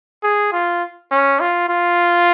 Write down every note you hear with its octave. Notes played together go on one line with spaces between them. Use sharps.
G#4
F4
C#4
F4
F4